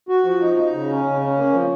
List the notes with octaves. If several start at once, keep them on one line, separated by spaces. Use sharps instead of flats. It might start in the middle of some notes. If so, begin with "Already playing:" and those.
F#4
F3
D#4
D#4
C#3
C#4
C#3
C#4
A#3
F3